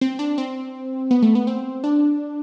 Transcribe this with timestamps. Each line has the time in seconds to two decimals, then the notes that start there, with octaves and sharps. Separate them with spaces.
0.01 C4
0.19 D4
0.38 C4
1.11 B3
1.22 A3
1.35 B3
1.47 C4
1.84 D4